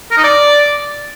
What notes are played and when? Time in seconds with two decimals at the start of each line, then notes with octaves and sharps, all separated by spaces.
0.11 A#4
0.17 D#4
0.24 D5